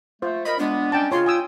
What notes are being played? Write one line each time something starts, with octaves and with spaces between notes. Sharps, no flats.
A3 F4 C5
A#4 D#5 B5
G#3 B3 D4
G3 C#4 D5 D#5 G5 A5
C#3 F4 C#5 C6
G5 G#5 D#6 E6